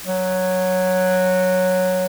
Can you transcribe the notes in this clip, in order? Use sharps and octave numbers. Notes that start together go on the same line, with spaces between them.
F#3